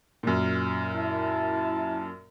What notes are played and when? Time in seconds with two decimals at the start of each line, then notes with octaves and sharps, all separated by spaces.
0.23 F#2 A#2
0.94 E4 A5